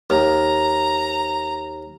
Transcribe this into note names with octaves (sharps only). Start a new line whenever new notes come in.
D#2 A#5